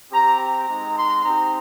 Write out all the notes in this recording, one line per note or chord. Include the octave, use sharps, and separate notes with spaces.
C4 G4 A#5
A#5
G#3 C4 D#4
C6
C4 D#4 G4 A#5